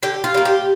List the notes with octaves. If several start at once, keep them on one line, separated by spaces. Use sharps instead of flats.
D3 G4
F4
G3 A#3
G4